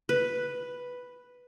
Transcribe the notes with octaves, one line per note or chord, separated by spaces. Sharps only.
B4